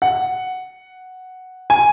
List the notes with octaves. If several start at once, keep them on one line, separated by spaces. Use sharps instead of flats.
F#5
G#5